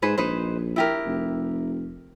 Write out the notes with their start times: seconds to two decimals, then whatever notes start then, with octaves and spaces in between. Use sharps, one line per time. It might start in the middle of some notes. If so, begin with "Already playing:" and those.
0.02 G#2 G#4 B4 C5
0.18 A#1 D#4 B4 C5
0.76 E4 G4 A#4
1.06 F1